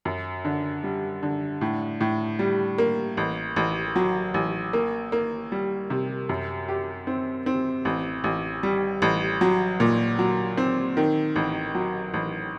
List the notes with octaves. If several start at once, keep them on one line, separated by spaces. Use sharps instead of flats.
F#2
D3
G3
D3
A2
A2
G3
A#3
A1
A1
F#3
A1
A#3
A#3
G3
C3
F#2
G4
C4
C4
A1
A1
G3
A1
F#3
A#2
F#3
C4
D#3
A1
F#3
A1